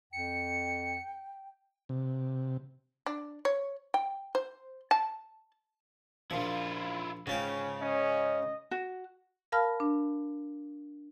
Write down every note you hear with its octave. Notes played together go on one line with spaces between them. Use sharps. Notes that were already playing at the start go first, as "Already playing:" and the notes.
F2 G5 C#7
C3
D4
C#5
G5
C5
A5
A#1 F3 E4 F4
G#2 C#3 C#4 F4 G5
C#4 D#5
F#4
A#4 F5 A5 B5 F6
D4